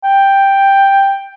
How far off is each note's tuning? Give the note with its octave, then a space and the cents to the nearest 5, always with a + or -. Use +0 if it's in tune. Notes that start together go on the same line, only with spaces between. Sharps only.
G5 +5